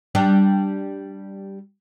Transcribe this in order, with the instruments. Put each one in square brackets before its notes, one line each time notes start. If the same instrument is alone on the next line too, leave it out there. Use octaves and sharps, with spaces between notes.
[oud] G3 D4 G4